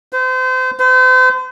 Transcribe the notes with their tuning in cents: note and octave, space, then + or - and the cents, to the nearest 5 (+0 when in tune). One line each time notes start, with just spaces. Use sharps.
C5 -35
C5 -40